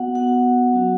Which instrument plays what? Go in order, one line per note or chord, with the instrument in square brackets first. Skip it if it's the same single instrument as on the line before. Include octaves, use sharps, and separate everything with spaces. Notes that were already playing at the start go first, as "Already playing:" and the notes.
Already playing: [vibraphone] B3 F#4 F#5
B3 F#4 F#5
F#3 C#4 F#4